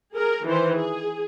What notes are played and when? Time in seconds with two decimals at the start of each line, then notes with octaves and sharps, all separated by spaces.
0.15 G#4 A#4
0.45 D#3 E3 C5
0.76 G#4